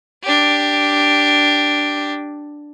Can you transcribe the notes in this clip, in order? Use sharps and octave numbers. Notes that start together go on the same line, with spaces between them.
D4 G4